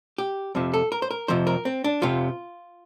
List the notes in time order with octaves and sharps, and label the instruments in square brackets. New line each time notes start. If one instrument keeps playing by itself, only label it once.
[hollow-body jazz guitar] G4
F2 C3 F3
A4
A#4
C5
A#4
F2 C3 F3 C5
A#4
C4
D4
F2 C3 F3 F4